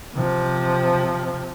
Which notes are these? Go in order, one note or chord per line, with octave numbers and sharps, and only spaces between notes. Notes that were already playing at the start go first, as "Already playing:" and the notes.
C3 F3